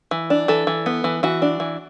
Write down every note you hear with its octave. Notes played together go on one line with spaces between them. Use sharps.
E3
D4
E3 A4
E3
B3
E3
E3 F#4
D4
E3